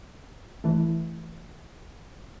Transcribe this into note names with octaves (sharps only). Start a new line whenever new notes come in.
E3 A3